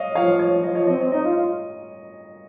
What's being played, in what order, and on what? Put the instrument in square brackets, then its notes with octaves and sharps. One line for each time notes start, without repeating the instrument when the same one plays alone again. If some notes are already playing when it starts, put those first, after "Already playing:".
Already playing: [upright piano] C#5 D#5 F5
[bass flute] F3 [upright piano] C#5 F5
[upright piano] C#5
[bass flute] F3 [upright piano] D#5
[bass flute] F3 [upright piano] C#5
[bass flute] C4 [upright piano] D#5
[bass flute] C4 [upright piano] C#5
[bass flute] D#4 [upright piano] D#5
[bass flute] F4
F4